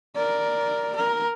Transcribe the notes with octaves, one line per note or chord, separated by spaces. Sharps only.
A#4 D5
A#4